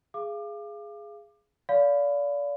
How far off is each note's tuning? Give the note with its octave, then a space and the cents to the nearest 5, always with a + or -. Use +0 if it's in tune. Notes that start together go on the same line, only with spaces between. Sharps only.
G#4 +0 F5 -30 D6 +25
D5 -35 F5 +5 B5 +25